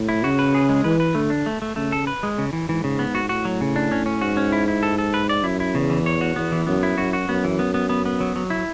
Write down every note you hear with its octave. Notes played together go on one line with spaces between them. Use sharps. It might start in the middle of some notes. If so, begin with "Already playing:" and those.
Already playing: A2
E4
C#3 F#4
B4
G#4
G#3
E3 B4
B4
D3 A3
D4
A3
A3
C#3 A3
A4
B4
G#3
C#3
E3
G#2 E3
C#3
B3
F#4
A2 F#4
F#3
C#3
D4
C#4
C#4
G#2 F#4
C#4
E4
E4
A4
A4
B4
D5
F#2 E4
E4
E2 C#3
E3
C#5
F#4
E2 B3
E3
F#2 B3
E4
F#2 F#4
F#4
F#2 B3
E3
B3
B3
B3
B3
F#3
F#3
E4